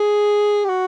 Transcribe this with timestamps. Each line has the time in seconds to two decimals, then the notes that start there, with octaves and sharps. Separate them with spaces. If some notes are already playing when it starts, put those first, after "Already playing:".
Already playing: G#4
0.65 G4
0.69 F#4